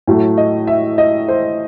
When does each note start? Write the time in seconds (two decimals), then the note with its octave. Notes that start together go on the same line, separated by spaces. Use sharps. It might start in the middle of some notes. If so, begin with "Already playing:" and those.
0.07 A2 F#3 A3
0.38 D#5
0.67 E5
0.98 D#5
1.28 C5